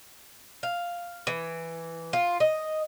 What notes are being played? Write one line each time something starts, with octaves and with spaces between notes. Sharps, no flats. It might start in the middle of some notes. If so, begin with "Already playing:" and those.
F5
E3
F4
D#5